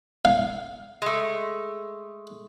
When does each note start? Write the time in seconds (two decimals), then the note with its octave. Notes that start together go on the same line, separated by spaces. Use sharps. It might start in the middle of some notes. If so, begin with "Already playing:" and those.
0.25 F5
1.02 G#3 A3